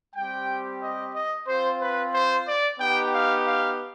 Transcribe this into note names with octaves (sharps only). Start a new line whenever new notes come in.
G3 C4 G4 G5
D#5
D#5
C4 F4 C5
B4
C5
D5
B3 D#4 G4 G5
F5
F5